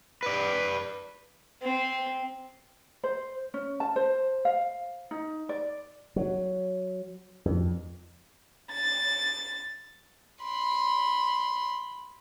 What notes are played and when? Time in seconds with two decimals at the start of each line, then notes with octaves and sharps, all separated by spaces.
0.23 B4 D5
1.62 C4
3.04 C5
3.54 C#4
3.80 A5
3.96 C5
4.45 F5
5.11 D#4
5.49 D5
6.16 F#3
7.45 F2
8.72 A6
10.44 B5 C6